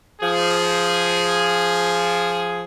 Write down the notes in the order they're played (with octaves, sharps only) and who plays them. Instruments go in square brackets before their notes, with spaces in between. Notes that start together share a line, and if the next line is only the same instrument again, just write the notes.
[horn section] F3 G#4